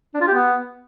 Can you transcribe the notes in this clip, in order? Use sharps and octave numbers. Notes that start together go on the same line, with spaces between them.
D4
F4
G4
B3